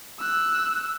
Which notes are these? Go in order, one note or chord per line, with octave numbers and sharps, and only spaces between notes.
E6 F#6